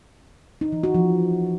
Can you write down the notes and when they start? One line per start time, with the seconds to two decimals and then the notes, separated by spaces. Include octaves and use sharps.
0.61 D#4
0.72 E3
0.83 F#4
0.95 F3